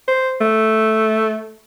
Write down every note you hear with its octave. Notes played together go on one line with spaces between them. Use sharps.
C5
A3